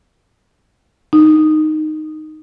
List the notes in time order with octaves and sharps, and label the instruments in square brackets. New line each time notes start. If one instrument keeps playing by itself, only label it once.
[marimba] D#4